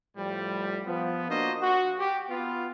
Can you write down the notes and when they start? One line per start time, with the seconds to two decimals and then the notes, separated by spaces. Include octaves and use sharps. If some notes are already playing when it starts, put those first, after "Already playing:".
0.17 A2 F3 G3
0.86 F3 B3
1.28 A#3 D4 F#4 C5 D#5
1.61 F#4
1.98 G4
2.30 B3 F4